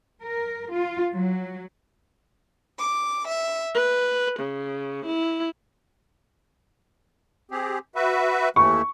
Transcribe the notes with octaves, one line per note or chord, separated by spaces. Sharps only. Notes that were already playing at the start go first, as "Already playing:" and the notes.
A#4
F4
F#3
D6
E5
B4
C#3
E4
C4 G4 G#4
F#4 B4 E5
D#2 E3 A3 C#6